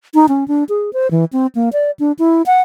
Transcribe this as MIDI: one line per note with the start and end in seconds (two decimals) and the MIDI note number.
0.14 0.26 63
0.28 0.47 61
0.48 0.64 62
0.69 0.90 68
0.93 1.10 72
1.11 1.25 52
1.33 1.47 60
1.55 1.69 58
1.73 1.91 74
1.99 2.12 62
2.19 2.42 64
2.46 2.61 78